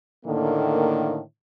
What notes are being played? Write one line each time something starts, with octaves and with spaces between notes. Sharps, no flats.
A2 D3 D#3 A#3